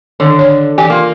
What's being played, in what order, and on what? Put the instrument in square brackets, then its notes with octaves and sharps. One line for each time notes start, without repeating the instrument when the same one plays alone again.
[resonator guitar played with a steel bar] D3 [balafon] D#3
[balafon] C#5
[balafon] E3 G#5 [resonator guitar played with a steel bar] G4
[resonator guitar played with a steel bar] A#3 F4